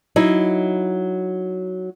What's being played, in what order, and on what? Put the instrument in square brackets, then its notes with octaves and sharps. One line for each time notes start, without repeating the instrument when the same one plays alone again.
[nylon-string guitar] F#3 D#4 E4